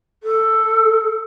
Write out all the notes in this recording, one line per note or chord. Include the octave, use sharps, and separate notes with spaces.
A4